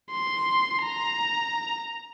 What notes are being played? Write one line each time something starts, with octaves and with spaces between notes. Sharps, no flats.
C6
A#5